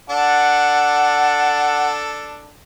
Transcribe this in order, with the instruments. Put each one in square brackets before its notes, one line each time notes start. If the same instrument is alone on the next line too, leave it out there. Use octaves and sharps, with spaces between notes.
[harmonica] D4 A4 [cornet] F#5